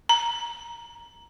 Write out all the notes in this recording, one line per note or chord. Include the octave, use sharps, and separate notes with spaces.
A#5